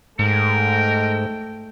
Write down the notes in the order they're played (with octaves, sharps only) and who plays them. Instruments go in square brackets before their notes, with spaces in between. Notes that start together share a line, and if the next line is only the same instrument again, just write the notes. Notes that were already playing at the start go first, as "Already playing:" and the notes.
[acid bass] G#2 [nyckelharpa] A3 G5 [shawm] A#4